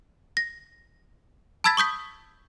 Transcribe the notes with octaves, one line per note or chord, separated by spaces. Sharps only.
A#6
A5 B5 E6 G#6 A6 B6
C#6 D#6 G6 B6